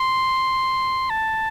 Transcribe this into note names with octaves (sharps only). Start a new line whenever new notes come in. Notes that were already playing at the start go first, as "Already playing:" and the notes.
Already playing: C6
A5